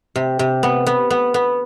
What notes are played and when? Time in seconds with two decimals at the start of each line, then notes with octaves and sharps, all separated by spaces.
0.16 C3
0.39 C3
0.63 B3
0.86 B3
1.10 B3
1.34 B3